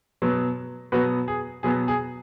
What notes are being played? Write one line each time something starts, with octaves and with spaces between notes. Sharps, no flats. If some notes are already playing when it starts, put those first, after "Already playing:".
B2 F#3 B3
B2 F#3 B3 F#4 B4
G#4
B2 F#3 B3 G#4
G#4